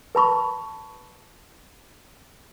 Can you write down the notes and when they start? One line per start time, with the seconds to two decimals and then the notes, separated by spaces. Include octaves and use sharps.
0.15 B4 A5 B5 C#6